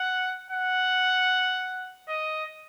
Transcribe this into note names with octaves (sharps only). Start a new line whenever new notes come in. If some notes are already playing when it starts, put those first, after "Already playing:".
Already playing: F#5
F#5
D#5